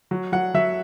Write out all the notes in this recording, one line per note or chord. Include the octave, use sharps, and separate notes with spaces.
F#3
F#3 F#5
F#3 E5